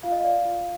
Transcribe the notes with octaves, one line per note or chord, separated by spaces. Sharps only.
F4 F5
D#5
D5 F5
F4